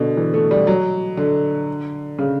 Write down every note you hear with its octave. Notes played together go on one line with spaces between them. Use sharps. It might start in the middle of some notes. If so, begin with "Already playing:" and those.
Already playing: B2 D3
E3
A3
G3
F#3
D3
C#3